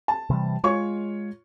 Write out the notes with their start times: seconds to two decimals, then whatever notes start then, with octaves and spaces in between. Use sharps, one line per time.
0.08 A5
0.30 C3 E3 G3
0.64 G#3 F4 C#5 C#6